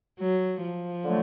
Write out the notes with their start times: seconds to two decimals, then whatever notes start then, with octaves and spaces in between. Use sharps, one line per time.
0.20 F#3
0.63 F3
1.04 D3 F#3 A3